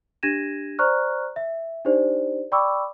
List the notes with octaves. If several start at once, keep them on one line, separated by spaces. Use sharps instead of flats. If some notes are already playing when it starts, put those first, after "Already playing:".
D4 G4 G#6 A#6 D#7 E7
C5 D5 A#5 C#6 F6 F#6
E5
D4 D#4 G4 C5 D5
D5 G5 B5 C#6 D6 E6